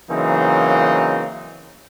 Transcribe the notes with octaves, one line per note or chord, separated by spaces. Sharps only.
C#3 E3 F#3 A#3 C4 D#4